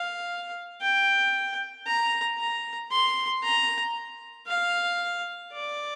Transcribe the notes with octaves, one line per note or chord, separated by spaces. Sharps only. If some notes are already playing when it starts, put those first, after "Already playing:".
Already playing: F5
G5
A#5
A#5
C6
A#5
F5
D5